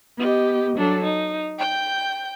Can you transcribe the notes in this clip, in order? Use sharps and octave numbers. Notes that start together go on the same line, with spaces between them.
B3 G4 D#5
F#3 D4 A4
D#4
G5 G6